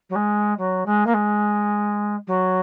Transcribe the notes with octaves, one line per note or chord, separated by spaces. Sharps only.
F#3
G#3
F#3
G#3
A#3
G#3
F#3